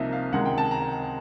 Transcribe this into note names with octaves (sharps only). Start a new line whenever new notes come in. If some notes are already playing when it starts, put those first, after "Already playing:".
Already playing: C2 C3 F3 A#3 D#4 D#5 E5
F5
C#2 C3 D#3 G#3 F#5
G5
A5
A#5